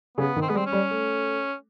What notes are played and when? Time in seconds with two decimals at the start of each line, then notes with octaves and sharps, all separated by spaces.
0.18 C#3 B3
0.36 D#3
0.42 C4
0.49 G#3 B3
0.54 G3
0.57 C4
0.66 C#4
0.72 G3
0.91 A3